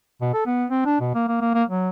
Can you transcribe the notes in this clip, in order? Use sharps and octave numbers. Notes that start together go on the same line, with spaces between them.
B2
A4
B3
C4
D4
B2
A#3
A#3
A#3
A#3
F#3